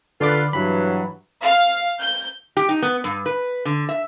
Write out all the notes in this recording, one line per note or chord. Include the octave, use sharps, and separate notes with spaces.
D3 F4 A4 B4 D5 D6
G2 E3 F#3 B5
F5
G6
G4
D#4
B3
G2
B4
D3
E5